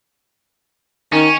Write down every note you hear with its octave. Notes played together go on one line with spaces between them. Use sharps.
D#3 C#4